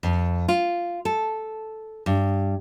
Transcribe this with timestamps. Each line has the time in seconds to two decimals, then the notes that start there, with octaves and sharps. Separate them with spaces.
0.03 F2
0.48 F4
1.05 A4
2.06 G2